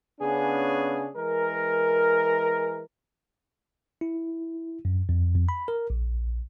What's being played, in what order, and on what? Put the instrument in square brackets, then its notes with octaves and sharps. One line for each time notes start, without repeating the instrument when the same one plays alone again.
[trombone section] C#3 B3 C#4 D4 G#4
E3 G#3 A#4
[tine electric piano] E4
F#2
F2
F2
B5
A#4
A#1